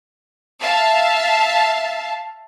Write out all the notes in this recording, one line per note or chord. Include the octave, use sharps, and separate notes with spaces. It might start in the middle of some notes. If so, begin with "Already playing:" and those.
E5 F5 A5